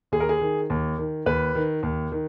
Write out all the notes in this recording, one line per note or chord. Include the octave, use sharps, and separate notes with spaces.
D#2 G#4
A#4
G#4
D#3
D#2
D#3
D#2 B4
D#3
D#2
D#3